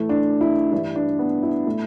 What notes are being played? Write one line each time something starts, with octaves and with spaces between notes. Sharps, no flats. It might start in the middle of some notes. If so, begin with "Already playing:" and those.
Already playing: A2 E3 A3
D4
E4
G2 E3 G3 E4
D4
B3
E4
A2 A3 E4